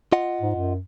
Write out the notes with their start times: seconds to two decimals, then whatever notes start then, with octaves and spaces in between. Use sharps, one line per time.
0.12 F4 D#5 F#5
0.41 G#2
0.55 F#2